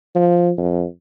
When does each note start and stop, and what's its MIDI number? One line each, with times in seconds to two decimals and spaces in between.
0.15 0.52 53
0.58 0.84 41